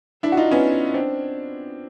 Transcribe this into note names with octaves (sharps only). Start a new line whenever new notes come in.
D4 E4
F#4
D#4 F4
B3 C#4
C4 D4